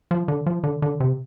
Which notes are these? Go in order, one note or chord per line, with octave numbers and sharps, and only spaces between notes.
F3
D3
F3
D3
D3
C3